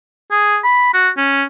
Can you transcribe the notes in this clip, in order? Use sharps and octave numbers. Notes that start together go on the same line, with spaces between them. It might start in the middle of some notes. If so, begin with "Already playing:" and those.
G#4
B5
F#4
C#4